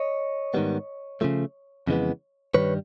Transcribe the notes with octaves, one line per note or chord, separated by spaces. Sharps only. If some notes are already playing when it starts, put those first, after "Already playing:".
Already playing: C#5 D#5
G#2 D#3 G3 B3
C#3 F3 A3
F2 C#3 E3 G#3 B3
G2 D#3 G3 B4 C#5